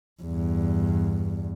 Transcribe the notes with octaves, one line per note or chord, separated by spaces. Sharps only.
E2 G2